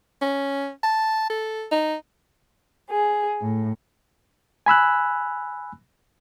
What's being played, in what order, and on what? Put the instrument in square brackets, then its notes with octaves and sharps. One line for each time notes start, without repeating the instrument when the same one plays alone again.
[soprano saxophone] C#4
A5
A4
D#4
[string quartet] G#4
A2
[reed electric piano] G#5 B5 E6 F#6